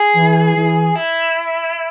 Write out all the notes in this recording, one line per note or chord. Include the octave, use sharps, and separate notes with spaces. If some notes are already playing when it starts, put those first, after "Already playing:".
Already playing: G#4
E3
E3
E4